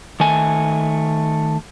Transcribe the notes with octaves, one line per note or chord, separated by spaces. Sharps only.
D#3 A3 G#5